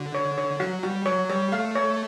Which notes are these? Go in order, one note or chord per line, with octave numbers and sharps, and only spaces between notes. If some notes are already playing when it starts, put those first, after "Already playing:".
Already playing: D3 F#4
C#5
C#5
F#3 F#4
G3 F#4
F#3 C#5
G3 C#5
A3 F5
C#5